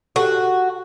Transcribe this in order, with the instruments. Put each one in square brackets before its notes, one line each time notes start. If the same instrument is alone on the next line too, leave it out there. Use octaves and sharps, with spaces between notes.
[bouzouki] F#4 [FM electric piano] G4 A4